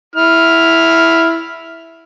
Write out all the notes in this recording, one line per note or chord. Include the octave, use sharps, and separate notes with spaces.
E4 F6